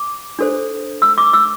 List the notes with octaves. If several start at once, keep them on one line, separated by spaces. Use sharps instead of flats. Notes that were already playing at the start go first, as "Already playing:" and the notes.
Already playing: D6
D4 A4 C5
E6
D6
E6